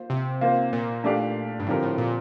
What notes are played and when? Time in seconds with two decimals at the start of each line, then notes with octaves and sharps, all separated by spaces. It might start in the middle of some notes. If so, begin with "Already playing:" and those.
Already playing: A#3 F4 C5
0.10 C3
0.41 A#3 F4 C5
0.73 A#2
1.04 A3 D4 G4 D5 F5
1.60 G2
1.67 A2 D3 F3 C4 G4 A#4
1.83 A2
1.98 A#2